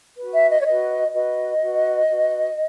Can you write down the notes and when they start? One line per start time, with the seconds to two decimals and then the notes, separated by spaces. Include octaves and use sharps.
0.18 F#4 B4
0.34 E5
0.50 D#5
0.59 C#5
0.66 F#4 B4 D#5
1.14 F#4 B4 D#5
1.62 F#4 B4
2.10 F#4 B4